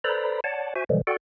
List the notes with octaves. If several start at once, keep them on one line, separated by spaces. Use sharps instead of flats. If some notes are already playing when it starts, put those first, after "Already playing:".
A4 B4 C5 D5 A#5 B5
C#5 D5 F#5 A5
F#4 C5 E5 G#5
B2 D3 E3 F3 G3 G#3
F#4 A4 D5 F#5 G5